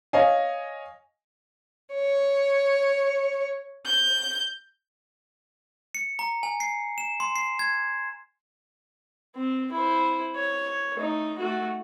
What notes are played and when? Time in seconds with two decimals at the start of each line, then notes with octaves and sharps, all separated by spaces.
0.13 C#5 D#5 F5 G#5
1.94 C#5
3.86 G6
5.95 C#7
6.19 A#5
6.43 G#5
6.60 C7
6.98 E7
7.20 C6
7.36 C7
7.59 G#6
9.36 C4
9.72 E4 C5
10.36 C#5
10.95 A3 D#4
11.38 A3 F#4